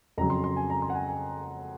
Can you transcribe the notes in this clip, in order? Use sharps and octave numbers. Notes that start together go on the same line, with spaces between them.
F2 C#3 F#3 A#5
C6
C6
G#5
A#5
C6
F#5
G#5
G#5